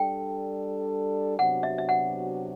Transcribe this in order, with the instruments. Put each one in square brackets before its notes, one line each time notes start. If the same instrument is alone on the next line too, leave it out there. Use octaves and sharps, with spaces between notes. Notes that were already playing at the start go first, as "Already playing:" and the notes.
Already playing: [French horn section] G3 D4 A4 [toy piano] G5
[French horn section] C3 F#3 B3 D4 F#4 [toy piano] F#5
[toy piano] E5
E5
F#5